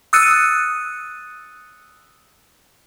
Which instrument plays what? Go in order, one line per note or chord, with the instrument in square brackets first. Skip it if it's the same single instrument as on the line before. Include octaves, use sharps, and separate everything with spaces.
[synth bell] D#6 E6 F#6 A6 C#7 D#7